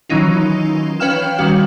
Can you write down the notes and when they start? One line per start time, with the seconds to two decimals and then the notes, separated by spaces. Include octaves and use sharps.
0.09 D#3 E3 F#3 C#4 D#4 F4
1.00 C#4 B4 F5 G5 F6 E7
1.38 D#3 G3 C#4 F#4 F5 F6